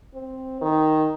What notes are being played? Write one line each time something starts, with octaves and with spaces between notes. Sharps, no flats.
C4
D#3